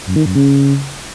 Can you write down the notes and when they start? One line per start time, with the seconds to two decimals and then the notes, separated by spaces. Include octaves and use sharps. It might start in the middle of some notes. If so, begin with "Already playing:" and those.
0.06 F#2
0.16 D#3
0.26 F#2
0.35 C#3